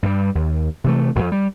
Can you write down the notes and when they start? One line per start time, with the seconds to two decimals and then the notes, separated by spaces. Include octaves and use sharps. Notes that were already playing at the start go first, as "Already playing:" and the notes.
0.03 G2 G3
0.35 D#2
0.84 C3 E3 A3
1.15 E1 F2
1.32 G3